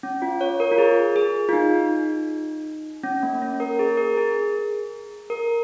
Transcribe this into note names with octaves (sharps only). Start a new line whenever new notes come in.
C#4
F4
C#5
A#4
F4
G#4
G#4
F4
D#4
C#4
A#3
C#4
A#4
G#4
A#4
G#4
A#4